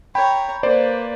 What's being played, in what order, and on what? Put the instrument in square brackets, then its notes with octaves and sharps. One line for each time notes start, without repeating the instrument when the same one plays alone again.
[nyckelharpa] C#5 A#5 [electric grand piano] G5 B5
[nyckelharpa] A#3 B4 [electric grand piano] C5 D5